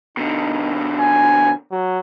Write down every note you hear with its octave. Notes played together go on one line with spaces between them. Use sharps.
B2 D3 D#4
G#5
F#3